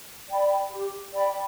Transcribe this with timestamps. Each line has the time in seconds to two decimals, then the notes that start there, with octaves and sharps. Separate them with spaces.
0.29 D5 G5 B5
0.71 G4
1.14 D5 G5 B5